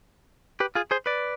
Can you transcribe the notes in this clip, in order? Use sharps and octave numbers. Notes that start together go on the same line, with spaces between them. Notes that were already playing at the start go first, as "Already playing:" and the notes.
G4 B4
F4 G#4
G#4 C5
B4 D5